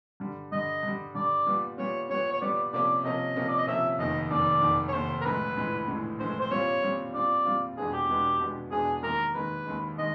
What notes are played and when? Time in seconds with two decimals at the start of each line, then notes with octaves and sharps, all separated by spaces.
0.20 G2 D3 G3
0.52 G2 D3 G3 D#5
0.83 G2 D3 G3
1.15 G2 D3 G3 D5
1.47 A#2 G3 B3
1.78 A#2 G3 B3 C#5
2.09 A#2 G3 B3 C#5
2.32 C#5
2.41 A#2 G3 B3 D5
2.73 C3 F3 A#3 C#4 D5
3.04 C3 F3 A#3 C#4 D#5
3.36 C3 F3 A#3 C#4
3.49 D5
3.58 D#5
3.67 C3 F3 A#3 C#4 E5
3.98 F1 D#2 D#3 D#5
4.30 F1 D#2 D#3 D5
4.61 F1 D#2 D#3
4.88 C#5
4.93 F1 D#2 D#3 C5
5.21 A#4
5.25 A#1 A2 E3 G#3 B4
5.57 A#1 A2 E3 G#3
5.88 A#1 A2 E3 G#3
6.19 A#1 A2 E3 G#3 C5
6.40 C5
6.51 A#2 G3 C4 F4 C#5
6.83 A#2 G3 C4 F4
7.14 A#2 G3 C4 F4 D5
7.45 A#2 G3 C4 F4
7.77 E2 B2 G#3 B3 D4 G#4
7.93 G4
8.09 E2 B2 G#3 B3 D4
8.40 E2 B2 G#3 B3 D4
8.71 E2 B2 G#3 B3 D4 G#4
9.03 D#2 D#3 G#3 A#4
9.34 D#2 D#3 G#3 B4
9.66 D#2 D#3 G#3
9.98 D#3 G#3 D#5